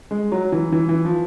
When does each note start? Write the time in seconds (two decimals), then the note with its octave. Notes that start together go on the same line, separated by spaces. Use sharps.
0.11 G#3
0.32 F#3
0.52 E3
0.72 E3
0.89 E3
1.05 F3